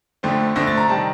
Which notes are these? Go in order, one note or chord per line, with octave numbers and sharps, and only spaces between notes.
F2 D3 A3 C4
F2 D3 A3 C4 A#6
A6
A#5
C3 D#3 G3 A5